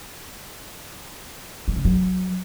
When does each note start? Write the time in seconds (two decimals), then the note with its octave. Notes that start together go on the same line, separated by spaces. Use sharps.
1.68 G3
1.76 C#3
1.85 F#3